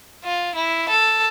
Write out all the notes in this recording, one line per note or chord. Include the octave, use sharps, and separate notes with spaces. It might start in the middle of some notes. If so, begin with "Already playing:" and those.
F4
E4
A4